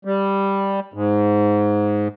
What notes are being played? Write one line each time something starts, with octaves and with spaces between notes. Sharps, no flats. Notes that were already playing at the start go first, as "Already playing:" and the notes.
G3
G#2